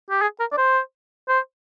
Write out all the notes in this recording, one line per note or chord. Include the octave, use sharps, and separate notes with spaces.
G4
G#4
A#4
D5
C5
C5